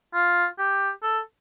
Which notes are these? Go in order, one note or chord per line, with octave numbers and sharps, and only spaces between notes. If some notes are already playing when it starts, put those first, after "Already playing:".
F4
G4
A4